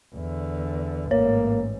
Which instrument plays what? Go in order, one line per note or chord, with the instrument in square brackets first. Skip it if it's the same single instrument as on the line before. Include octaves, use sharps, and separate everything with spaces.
[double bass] E2 D3
[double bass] A1 G#2 [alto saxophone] A#3 [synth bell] C#5